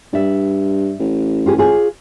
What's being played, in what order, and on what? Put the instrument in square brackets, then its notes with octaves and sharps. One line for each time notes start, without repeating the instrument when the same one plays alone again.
[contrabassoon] G2 [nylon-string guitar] D5 E5
[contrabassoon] A1
[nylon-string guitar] F4 G4 G#4
F4 G#4 C#5